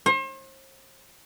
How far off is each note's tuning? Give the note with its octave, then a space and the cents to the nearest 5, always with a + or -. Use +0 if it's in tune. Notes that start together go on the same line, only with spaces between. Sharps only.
C5 +40